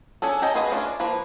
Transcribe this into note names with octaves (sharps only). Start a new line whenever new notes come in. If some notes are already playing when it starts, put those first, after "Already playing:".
C#4 D4 G#4 A4
C#4 D#5 G5 A5 A#5
F4 F#4 G#4 B4 D#5
A3 C#4 D4 F4
D5
F3 A#3 B4